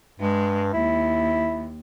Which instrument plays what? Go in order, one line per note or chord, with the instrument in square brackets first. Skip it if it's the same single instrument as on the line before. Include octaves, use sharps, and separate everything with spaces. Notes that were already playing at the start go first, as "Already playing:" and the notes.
[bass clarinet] G2 [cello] G#3
[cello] D#2 [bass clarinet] E4